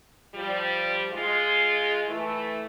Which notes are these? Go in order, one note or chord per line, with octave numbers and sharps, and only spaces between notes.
F3 G3
G#3 F4
E3 A3